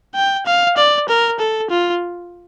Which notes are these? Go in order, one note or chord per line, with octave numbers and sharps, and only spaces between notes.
G5
F5
D5
A#4
A4
F4